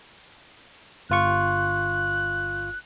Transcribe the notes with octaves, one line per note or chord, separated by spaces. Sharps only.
G1 F4 C#6 F#6